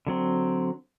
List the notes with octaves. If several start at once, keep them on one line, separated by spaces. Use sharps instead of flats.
D3 F#3 C4